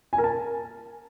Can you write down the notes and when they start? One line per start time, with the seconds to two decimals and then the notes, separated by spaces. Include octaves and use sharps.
0.13 G#5
0.18 A#4
0.24 A5